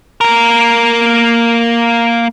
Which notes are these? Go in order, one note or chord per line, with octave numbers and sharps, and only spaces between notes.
A#3 A#4